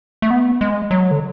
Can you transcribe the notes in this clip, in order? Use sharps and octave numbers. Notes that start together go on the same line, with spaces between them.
A3
B3
G#3
F#3
D3